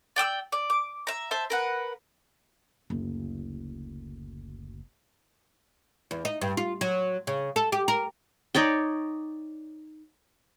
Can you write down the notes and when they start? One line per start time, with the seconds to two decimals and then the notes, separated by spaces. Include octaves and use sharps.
0.16 D5 G5 D#6 E6
0.52 D5
0.70 D6
1.07 E5 A#5
1.31 C5 E5 A5
1.50 A#4 B4 F#5
2.90 F#1 D2
6.11 E2
6.25 D#4
6.41 G2
6.57 F4
6.81 F#3
7.27 C#3
7.56 A4
7.72 G4
7.88 A#4
8.55 D#4 C#5 D5 G5